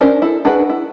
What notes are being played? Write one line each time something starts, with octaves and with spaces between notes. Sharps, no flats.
C#4 D4 A#4 C5
E4 A4
D4 F#4 G#4 A#4 B4
E4